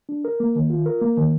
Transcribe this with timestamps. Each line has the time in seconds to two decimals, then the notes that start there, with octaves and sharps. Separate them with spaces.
0.09 D4
0.25 A#4
0.40 A#3
0.55 D#3
0.70 F4
0.86 A#4
1.01 A#3
1.17 D#3